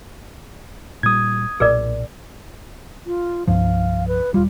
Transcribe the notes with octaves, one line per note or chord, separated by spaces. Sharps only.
A#2 G3 D#6 G#6
B1 A#2 G#4 A#4 D5
F4
C2 G2 F3 F5
B4
D#1 G3 F4